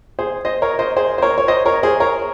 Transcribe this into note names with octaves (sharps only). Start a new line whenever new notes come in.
G#4 C5
C5 D#5
A#4 C#5
C5 D#5
G#4 C5
C5
A#4 C#5
C#5
C5 D#5
A#4 C#5
G#4 C5
A#4 C#5